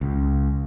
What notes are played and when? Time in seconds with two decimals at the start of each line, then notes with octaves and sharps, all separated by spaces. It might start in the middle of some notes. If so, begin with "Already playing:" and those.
0.01 C#2